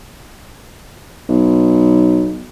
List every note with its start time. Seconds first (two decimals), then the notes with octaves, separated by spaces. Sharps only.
1.29 B1